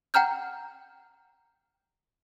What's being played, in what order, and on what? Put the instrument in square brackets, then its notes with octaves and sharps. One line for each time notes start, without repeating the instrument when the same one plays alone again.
[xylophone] F#5 G5 A#5 F6 G6